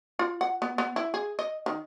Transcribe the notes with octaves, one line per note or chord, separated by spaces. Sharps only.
F4
F#5
B3
B3
E4
G#4
D#5
D#3